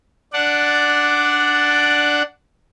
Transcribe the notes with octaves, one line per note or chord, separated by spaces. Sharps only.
D4 D5 F#5